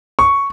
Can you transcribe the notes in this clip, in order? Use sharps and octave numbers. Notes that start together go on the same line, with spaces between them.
C#6